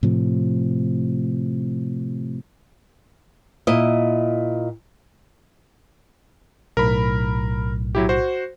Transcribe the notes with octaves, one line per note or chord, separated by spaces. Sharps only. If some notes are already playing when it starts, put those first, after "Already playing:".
A2 C3 F3
A#2 E4 D#5
B1 A2 A#4 B5
F#3 E4 G4
F#4 C5